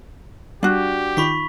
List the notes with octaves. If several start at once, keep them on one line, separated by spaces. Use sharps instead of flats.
G3 D4 F#4 G4
D#3 D#4 F4 B5 C#6 B6